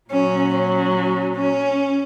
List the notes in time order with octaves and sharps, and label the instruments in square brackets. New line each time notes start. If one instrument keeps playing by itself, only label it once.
[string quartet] A#2 F#3 C#4
C#4
C#4